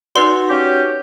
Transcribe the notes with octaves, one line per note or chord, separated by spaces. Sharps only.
D#4 F#4 B4 D5 C6
C#4 G4